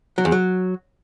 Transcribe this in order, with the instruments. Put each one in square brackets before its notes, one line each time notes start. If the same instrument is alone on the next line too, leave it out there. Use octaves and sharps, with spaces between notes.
[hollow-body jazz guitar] F#3
E2
F#3